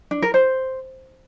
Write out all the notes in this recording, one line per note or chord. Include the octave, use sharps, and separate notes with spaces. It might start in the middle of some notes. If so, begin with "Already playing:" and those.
D4
A#4
C5